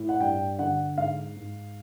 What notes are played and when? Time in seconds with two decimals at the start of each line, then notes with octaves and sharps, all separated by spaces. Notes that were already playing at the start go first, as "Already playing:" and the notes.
Already playing: A2
0.09 F#5
0.20 G2 G5
0.59 D3 F#5
0.98 G#2 F5
1.36 G#2